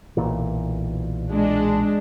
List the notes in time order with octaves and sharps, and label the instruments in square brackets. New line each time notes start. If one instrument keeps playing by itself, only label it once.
[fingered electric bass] B1 A#2 E3
[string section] G#3 D4